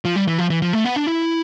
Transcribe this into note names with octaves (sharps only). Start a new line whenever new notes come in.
F3
G3
E3
F3
E3
F3
A3
B3
D4
E4